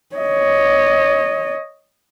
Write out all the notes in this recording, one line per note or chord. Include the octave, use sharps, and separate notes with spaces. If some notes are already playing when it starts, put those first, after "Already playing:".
C#5 D#5